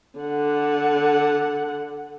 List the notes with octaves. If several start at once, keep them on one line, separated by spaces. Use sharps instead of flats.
D3 F#5